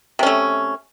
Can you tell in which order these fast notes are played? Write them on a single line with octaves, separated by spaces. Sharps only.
C3 C#4 A3